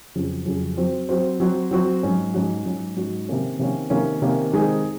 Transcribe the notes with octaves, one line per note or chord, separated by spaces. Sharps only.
F2 C#3 F#3 C#4 G#4
F2 C#3 F#3 C#4 G#4
F#3 C4 F#4 C5
F#3 C4 F#4 C5
F#3 C4 F#4 C5
F#3 C4 F#4 C5
G#2 F#3 C#4 F#4
G#2 F#3 C#4 F#4
G#2 F#3 C#4 F#4
G#2 F#3 C#4 F#4
C3 D#3 A#3 C#4
C3 D#3 A#3 C#4
C3 D#3 A#3 C#4
C3 D#3 A#3 C#4
D#3 G#3 C4 D#4 G#4